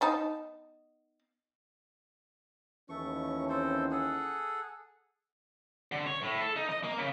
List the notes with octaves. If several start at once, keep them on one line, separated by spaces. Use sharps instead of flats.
B3 D#4 A5
D#2 E3 A3 C#4 C#6
C4 A4 C5
G#4 A4 F#5
D3
C#5
A2
A4
D#4
D#5
A#3
C#3